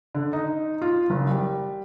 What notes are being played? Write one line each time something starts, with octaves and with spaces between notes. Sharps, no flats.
D3
D#4
F4
F#1
G3